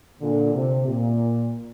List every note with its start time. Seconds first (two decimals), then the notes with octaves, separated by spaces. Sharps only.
0.21 A#2 D3
0.54 C3
0.87 A#2